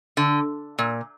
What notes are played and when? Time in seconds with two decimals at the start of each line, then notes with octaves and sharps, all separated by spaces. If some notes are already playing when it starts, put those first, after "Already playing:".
0.17 D3
0.78 A#2